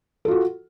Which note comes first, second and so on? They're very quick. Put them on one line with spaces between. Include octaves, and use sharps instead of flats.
A4 F4 F#4